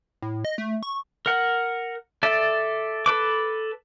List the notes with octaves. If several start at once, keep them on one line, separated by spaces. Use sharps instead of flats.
A2
D#5
A3
C#6
A#4 F#5
A4 D5 E5
A4 B4 D6